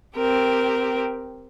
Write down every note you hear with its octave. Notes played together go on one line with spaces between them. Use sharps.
C4 G4 A#4